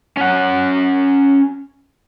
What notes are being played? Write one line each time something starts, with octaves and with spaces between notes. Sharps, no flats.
C#4 F#5